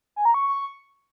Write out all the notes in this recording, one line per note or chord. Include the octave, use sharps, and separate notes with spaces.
G#5
A#5
C#6